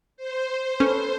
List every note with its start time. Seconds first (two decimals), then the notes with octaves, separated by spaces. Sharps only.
0.17 C5
0.80 C#4 A4 B4